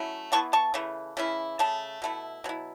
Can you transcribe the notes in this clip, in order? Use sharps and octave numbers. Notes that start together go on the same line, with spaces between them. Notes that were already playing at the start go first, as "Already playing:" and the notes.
Already playing: F#3 A3 C#4 E4
E3 B3 E4 A5 C#6
A5 C#6
C#3 E3 A3
C#3 E3 C#4 E4
C#3 A3 A5
B2 A3 E4
B2 F#3 E4